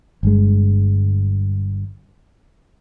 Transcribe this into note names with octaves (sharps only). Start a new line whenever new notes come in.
G1 G2 G#3